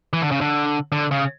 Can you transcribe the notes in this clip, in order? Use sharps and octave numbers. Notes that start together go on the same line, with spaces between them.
E3
D3
C#3
D3
D3
C#3